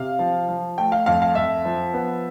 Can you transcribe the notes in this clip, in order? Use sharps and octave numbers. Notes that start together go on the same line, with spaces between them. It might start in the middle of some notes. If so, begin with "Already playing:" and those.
Already playing: C3 F5
F3
F3
A3 G5
F5
F2 F5
F5
F2 E5
F3
B3